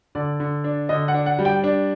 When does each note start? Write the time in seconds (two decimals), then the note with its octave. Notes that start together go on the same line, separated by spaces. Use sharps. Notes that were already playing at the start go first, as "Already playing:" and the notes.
0.15 D3 D5
0.40 D3
0.64 D4
0.89 D3 D#5
1.08 F#5
1.14 D4
1.26 F#5
1.39 G3
1.45 G5
1.64 D4